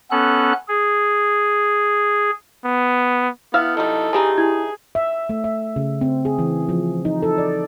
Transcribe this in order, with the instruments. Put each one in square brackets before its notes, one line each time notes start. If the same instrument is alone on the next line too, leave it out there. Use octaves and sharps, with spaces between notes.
[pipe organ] B3 C#4 A4 F#6
G#4
[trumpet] B3
[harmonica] B3 [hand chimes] E4 [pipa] E5 F5 [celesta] E6 F6
[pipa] B2 G3 [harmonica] D#4 A4
[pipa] D3 E3 D#4 [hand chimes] G4 A5 [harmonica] G#4
[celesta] E4 [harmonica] G#4 [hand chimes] G#6
[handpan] E5
A3
E5
C#3
C4
G#4
E3
F3
D#4
A4
D5